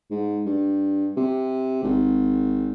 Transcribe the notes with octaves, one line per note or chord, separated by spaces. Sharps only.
G#2
G2
C3
G#1